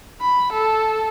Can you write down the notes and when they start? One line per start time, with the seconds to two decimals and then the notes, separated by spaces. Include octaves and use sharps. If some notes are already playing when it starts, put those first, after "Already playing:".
0.21 B5
0.53 A4